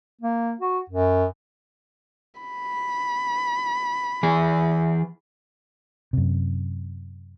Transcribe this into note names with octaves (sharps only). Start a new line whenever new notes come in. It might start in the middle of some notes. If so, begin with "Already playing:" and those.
A#3
F#4
F#2
B5
E3 G#4
F#2 C3